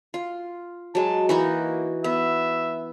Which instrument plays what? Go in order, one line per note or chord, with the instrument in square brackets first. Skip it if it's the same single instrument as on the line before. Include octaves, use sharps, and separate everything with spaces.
[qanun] F4
[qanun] F#3 G#3 [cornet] A5
[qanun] E3 D#4 F#4 [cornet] A#3
[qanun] B3 [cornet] E5